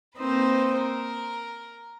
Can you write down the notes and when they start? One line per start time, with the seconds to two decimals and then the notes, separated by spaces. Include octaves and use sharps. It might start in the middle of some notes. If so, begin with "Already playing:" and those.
0.17 A#3 C4 D#4 B4 C5
0.76 A#4